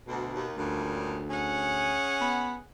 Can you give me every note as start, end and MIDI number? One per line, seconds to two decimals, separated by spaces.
0.08 0.33 38
0.08 0.46 47
0.34 0.55 39
0.57 1.98 38
0.57 1.20 43
0.57 1.20 46
0.57 1.20 49
1.30 2.64 61
1.30 2.64 68
1.30 2.64 78
2.21 2.56 59